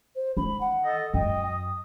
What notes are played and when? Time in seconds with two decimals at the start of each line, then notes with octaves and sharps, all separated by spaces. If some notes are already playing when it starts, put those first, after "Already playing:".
0.15 C5
0.37 D#3 B5
0.60 F#5
0.85 A4 D#5
1.14 F#2 D#5 G5
1.46 D#6